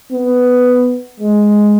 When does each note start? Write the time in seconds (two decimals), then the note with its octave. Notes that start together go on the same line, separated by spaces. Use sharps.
0.12 B3
1.20 G#3